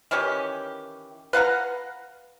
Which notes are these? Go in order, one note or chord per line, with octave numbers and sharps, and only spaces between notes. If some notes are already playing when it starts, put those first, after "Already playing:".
D#3 E3 C#4 G4
B4 F5 F#5 A#5